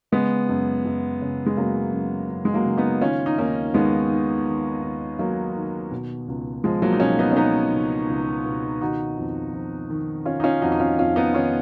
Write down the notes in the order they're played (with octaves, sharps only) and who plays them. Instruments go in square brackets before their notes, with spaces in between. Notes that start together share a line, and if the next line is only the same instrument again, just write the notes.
[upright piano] C#3 G#3 B3
F#2
F#2
C#3
G#3
C#3 F#3 A#3
F#2
F#2
G#3
F#3 A#3
C#3
B3 D#4
D#3 C#4 F4
D#4
D#2 A#3 C#4
D#2 G#3 B3
D#3
D#3
D#2
D#2 F#3 A#3
D#3
B2
C#2
C#2 F3 G#3
F#3 A#3
D#4
B2 C#4 F4
B3 D#4
C#4
B2 B3 D#4
C#2
C#2
B2
D#3 D#4 F#4
F2
F2
D#3
D#3 C#4 F4
D#4
C#4 F4
F2 D#4 F#4
D#4
C#4 F4
F2 C#4 F4
B3 D#4
D#3 C#4 F4